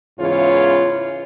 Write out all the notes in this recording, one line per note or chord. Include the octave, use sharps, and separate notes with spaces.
E2 G#2 C#3 E3 F4 C#5